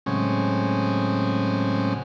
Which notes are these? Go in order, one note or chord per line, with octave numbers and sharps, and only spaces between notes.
A2 C#3 F#3 G#3 C4 C#4